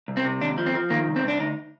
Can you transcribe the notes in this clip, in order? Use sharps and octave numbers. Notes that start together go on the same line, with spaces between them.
C2
C4
C3
D#2 D4
F3
C4
F3
D#3 A#3
C2
C4
C2 D4
D2 D#4